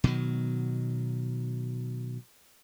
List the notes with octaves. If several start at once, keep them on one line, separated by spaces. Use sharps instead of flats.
B2 D#3 F#3